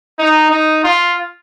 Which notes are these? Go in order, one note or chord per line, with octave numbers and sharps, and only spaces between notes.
D#4
D#4
F4